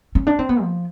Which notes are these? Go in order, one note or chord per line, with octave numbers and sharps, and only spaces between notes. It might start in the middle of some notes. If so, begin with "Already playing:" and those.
C#4
D4
C4
B3
F3